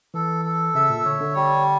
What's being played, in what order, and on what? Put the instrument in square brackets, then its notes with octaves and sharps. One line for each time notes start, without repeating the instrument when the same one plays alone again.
[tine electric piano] E3 [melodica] A4
[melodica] A4
[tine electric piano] C#3 [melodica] E5
[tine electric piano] A#2
[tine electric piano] D3 [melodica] C#5
[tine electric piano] D3
[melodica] G3